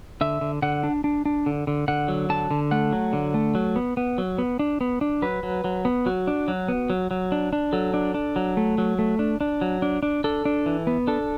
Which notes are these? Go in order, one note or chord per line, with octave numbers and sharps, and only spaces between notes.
D3 E5
D3
D3 F#5
D4
D4
D4
D3
D3
D3 F#5
F#3
D3 A5
D3
A3 F#5
F#3
D3
A3
F#3
B3
B3
F#3
B3
D4
B3
D4
F#3 B4
F#3
F#3
B3
F#3 F#4
D4
F#3
B3
F#3
F#3
D4
D4
F#3 A4
D4
D4
F#3
A3
F#3
A3
D4
D4
F#3
D4
D4
D4 A4
D4
E3
B3
D4 A4